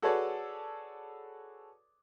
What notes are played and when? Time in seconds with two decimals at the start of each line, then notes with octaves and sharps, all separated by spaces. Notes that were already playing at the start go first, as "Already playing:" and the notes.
0.02 F#4 G#4 A4 B4 C#5 D5